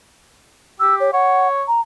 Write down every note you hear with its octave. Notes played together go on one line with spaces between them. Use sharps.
G4 E6
C#5
C#5 F#5
A#5